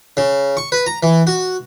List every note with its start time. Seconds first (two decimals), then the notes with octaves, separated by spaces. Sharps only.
0.17 C#3
0.57 C#6
0.72 B4
0.86 A#5
1.03 E3
1.27 F#4